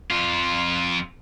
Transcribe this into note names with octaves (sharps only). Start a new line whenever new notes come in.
F2 F4